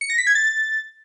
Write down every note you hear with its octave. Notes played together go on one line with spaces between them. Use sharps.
C#7
A#6
B6
G#6
A6